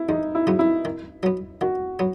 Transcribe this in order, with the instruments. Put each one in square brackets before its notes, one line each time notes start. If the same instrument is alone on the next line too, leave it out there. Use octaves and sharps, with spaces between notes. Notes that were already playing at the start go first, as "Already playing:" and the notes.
Already playing: [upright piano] E4
[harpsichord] E2 [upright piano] D#4
[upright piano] E4
[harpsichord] C#3 F#3 B3
[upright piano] E4
[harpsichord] D#3
F#3 B3
[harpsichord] D#3 [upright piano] F#4
[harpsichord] F#3 B3